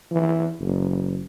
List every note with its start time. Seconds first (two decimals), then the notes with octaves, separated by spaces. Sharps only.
0.11 E3
0.60 F#1